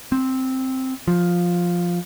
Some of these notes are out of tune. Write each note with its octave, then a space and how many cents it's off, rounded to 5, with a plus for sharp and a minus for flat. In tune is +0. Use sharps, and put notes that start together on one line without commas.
C4 +0
F3 +5